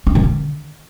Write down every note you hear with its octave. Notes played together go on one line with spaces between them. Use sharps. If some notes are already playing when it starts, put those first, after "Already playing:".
D4
D#3
D3